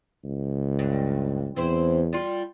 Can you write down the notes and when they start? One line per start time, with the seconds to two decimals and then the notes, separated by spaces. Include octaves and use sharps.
0.24 C#2
0.79 G2
1.56 E2 C4 E4 C5
2.13 G3 F4